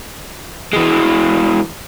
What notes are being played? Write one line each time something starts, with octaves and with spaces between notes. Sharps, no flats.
E3 G#3